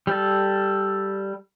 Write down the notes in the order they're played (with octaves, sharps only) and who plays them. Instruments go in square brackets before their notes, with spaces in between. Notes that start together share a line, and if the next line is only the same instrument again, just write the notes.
[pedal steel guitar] G3 A4